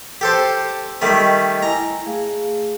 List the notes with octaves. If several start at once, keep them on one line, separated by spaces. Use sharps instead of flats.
G4 A4 C5
D#3 G3 A3 D#5
E4 G#5 A#5
A3 G#4 F5